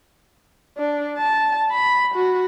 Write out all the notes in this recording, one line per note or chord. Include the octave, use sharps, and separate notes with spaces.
D4
A5
B5
F#4